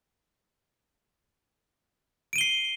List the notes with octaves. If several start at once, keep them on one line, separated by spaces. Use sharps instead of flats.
C7 D7 D#7 G7